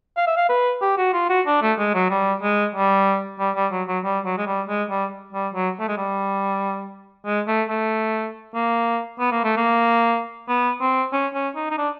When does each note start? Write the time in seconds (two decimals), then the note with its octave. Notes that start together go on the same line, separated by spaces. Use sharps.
0.17 F5
0.27 E5
0.37 F5
0.49 B4
0.81 G4
0.97 F#4
1.13 F4
1.29 F#4
1.46 D4
1.62 A3
1.78 G#3
1.94 F#3
2.10 G3
2.43 G#3
2.75 G3
3.39 G3
3.55 G3
3.71 F#3
3.88 F#3
4.04 G3
4.25 F#3
4.38 G#3
4.47 G3
4.68 G#3
4.90 G3
5.33 G3
5.54 F#3
5.79 A3
5.88 G#3
5.97 G3
7.26 G#3
7.48 A3
7.69 A3
8.54 A#3
9.19 B3
9.31 A#3
9.44 A3
9.57 A#3
10.48 B3
10.81 C4
11.13 C#4
11.34 C#4
11.55 D#4
11.71 D#4
11.78 D4